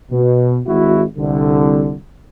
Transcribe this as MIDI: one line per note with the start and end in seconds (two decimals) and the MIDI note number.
0.12 0.59 47
0.67 1.03 32
0.67 1.03 64
0.67 1.03 66
1.17 1.95 36
1.17 1.95 50